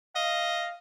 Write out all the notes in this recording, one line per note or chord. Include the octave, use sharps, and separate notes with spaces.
D#5 F5